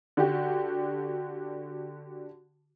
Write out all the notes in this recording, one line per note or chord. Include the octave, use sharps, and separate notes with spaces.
D3 F#4 G4